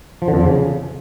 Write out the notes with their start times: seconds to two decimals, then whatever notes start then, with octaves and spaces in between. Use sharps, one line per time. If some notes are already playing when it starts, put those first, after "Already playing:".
0.22 F3
0.28 D3
0.34 F2
0.40 F3
0.46 C#3